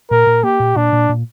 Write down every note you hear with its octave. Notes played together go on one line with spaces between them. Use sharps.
A#2 A#4
A#2
A#3 G4
A#2
A#2 D4
A#2
A#2